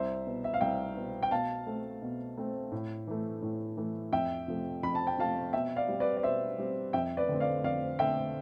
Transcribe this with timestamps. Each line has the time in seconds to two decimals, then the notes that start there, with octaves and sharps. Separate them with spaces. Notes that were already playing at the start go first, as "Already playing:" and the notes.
Already playing: C2 C5 E5
0.27 B2 B3
0.44 E5
0.54 F5
0.61 C2 E5 G5
0.96 B2 B3
1.23 G5
1.31 B2 F5 A5
1.66 A3 C4
2.02 B2
2.37 A3 C4
2.72 A2
3.07 E3 A3
3.42 A2
3.77 E3 A3
4.12 F2 E5 G5
4.48 C3 F3 A3
4.83 F2 B5
4.95 A5
5.07 G5
5.18 C3 F3 A3 F5 A5
5.53 B2 E5 G5
5.76 D5 F5
5.88 G3 C4
6.00 B4 D5
6.17 D5
6.23 B2 C5 E5
6.58 G3 C4
6.93 F2 E5 G5
7.17 B4 D5
7.29 D3 A3 C4
7.40 D5 F5
7.64 F2 D5 F5
7.99 D3 A3 C4 E5 G5